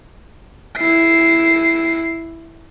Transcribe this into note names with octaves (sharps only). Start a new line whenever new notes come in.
E4 C7